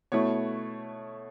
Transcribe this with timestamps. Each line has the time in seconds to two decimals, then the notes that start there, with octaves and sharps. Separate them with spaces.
0.12 B2 A3 E4 C#5